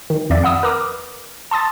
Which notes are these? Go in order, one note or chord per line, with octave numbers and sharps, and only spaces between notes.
D#3
F2 D5 E5
F5 F#5 B5 D#6 E6
A#4 B4 A#5 D6 D#6 F6
A5 C6 D#6 A6